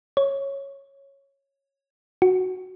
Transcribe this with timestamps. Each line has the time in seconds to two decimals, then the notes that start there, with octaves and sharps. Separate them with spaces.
0.17 C#5
2.22 F#4